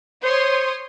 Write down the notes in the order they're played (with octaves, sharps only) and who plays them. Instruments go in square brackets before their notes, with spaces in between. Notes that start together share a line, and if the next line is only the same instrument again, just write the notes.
[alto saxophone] C5 [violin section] C#5 C6 D#6